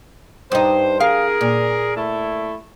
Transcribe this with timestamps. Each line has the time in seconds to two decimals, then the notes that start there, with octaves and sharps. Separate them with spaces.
0.52 G2 D#4 C5
1.00 G#4 A#4 F5
1.41 A#2
1.97 A3 E4